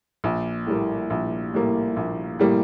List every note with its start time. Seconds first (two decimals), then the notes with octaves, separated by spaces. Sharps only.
0.24 A#1
0.67 A2 G3 A#3
1.10 A#1
1.54 A2 G3 A#3
1.96 A#1
2.39 A2 G3 A#3